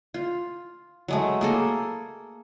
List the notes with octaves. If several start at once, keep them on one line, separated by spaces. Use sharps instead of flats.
F4
F#3 G#3 A3
A#3 G#4 A4